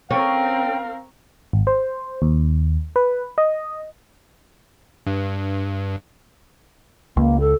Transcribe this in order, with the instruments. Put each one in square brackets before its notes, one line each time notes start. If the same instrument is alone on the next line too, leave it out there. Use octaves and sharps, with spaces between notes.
[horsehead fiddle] C4 A#4 [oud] C#4 [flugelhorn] F5 [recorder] G5
[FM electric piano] G#1
C5
D#2
B4
D#5
[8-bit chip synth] G2
[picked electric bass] C#2 [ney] A#3
[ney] A4